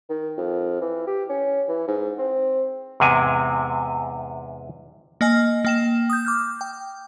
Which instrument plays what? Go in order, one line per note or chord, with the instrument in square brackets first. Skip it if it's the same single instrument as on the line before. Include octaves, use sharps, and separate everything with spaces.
[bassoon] D#3
F2
E3
G4
C#4
E3
G#2
C4
[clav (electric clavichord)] E2 G#2 C3 G#5
[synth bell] A#3 D#5 G#5 F6
A#3 G5 E7
D#6 G6
D6 F6 G6
G5